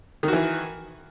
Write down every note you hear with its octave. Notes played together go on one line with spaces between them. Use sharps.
D#3 E3 F#4